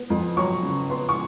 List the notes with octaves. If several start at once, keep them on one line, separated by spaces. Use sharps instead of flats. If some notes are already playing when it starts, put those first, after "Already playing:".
Already playing: B3
F2
F#3 C#6
C#3
B3 C6
C#6